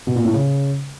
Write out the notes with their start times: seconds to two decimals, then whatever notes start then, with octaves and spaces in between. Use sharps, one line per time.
0.07 B2
0.16 A#2
0.25 A2
0.34 C#3